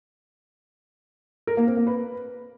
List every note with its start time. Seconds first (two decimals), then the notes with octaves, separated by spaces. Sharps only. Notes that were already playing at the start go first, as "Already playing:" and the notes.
1.47 A#4
1.57 A#3
1.67 C4
1.77 A#3
1.87 B4